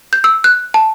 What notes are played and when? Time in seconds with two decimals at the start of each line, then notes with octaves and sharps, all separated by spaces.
0.13 G6
0.24 E6
0.44 F#6
0.74 A5